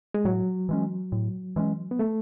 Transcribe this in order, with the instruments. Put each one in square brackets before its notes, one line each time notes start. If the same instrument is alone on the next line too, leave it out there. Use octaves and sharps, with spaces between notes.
[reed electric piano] G#3
[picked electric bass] A2 [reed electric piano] F#3
[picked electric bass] E3 G#3 C#4
A2
E3 G#3 C#4
[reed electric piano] B3
A3